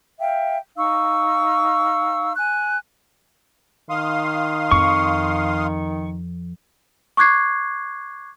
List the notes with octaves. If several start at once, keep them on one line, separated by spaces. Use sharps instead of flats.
E5 F5 G5
D#4 F5 C#6 E6
G#5 F#6
D#3 F5 C6 D#6
F2 C#6
C#6 D6 F#6 G#6 C7